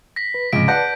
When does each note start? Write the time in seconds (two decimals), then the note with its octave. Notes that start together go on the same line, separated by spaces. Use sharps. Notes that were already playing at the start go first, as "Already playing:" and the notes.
0.16 A#6 B6
0.34 B4
0.53 C#2 G#2 C3 F3 D7
0.68 B4 D5 F#5 A5 G6 A#6